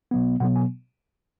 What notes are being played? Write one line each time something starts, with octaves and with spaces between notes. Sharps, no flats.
B2 F#3 B3
B2 F#3 B3 F#5
G#5